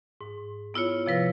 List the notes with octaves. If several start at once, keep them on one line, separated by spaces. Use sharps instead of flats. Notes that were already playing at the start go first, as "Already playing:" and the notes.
G#2
B3 E4 F4 C#5
C3 F3 B4 A#6